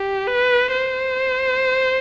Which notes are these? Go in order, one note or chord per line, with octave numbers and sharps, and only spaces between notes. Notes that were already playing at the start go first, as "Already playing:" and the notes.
Already playing: G4
B4
C5